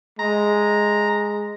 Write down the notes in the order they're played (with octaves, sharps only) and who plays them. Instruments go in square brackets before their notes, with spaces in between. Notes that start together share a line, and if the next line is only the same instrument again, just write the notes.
[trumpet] G#3 [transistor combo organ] A#5